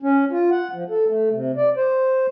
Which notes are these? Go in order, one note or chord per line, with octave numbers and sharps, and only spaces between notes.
C#4
F4
F#5
F3
A4
A3
C3
D5
C5